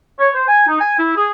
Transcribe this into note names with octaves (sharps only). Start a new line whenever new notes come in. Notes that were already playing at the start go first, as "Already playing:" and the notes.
C#5
C5
G#5
D#4
G#5
E4
G#4